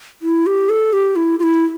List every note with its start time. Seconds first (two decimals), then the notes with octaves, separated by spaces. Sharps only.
0.22 E4
0.46 G4
0.69 A4
0.93 G4
1.16 E4
1.39 F4
1.43 E4